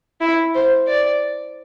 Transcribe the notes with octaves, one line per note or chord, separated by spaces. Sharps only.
E4
C5
D5